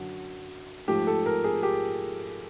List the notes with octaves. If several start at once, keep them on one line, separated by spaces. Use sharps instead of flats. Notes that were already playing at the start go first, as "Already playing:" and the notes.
Already playing: F#2 D3 F#3
G#2 F3 A3 G4
A4
A#4
G#4
G4